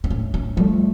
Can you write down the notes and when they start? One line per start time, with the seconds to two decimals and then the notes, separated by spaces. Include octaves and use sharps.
0.04 C4
0.10 A2 C#4
0.34 C#4
0.57 F3 G3
0.60 A3